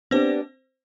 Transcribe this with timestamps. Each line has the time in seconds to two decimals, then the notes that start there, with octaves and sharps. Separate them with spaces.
0.11 B3 C4 D4 G4 C5 D5